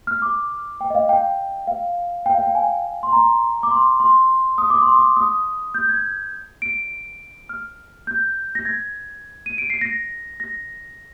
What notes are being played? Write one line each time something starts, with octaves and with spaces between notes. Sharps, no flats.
F6
D6
G5
D#5
F5
G5
F5
G5
F5
G5
G#5
C6
A#5
D6
C6
C6
D#6
D6
C6
D6
D#6
G6
G#6
D7
F6
G6
A#6
G#6
D#7
D7
C7
A#6
A#6